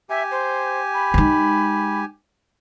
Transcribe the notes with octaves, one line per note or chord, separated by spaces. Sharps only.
G4 E5 G#5
C5
B5
G#3 D#4